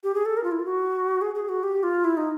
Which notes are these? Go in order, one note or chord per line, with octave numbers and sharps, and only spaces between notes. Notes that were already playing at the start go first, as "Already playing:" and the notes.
G4
G#4
A4
A#4
F4
E4
F4
F#4
G#4
G#4
F#4
G4
F4
E4
D#4